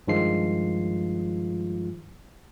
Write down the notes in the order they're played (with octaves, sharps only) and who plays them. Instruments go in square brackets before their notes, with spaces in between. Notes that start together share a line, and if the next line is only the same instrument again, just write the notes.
[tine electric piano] G2 D#3 F3 G#3 F4 C7